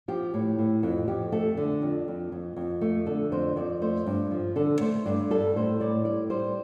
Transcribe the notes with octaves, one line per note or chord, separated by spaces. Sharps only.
F3 G4
A2
A2
F2 A4
F2 G4
A3 A4
D3
F2
F2
F2
F2
A3
D3 A4
F2 C5
F2 D5
A3 C5
G2
F3
D3 A4
A3 C5
G2 D5
G3 A4
A2 C5
A2 D5
G3 D5
G3 C5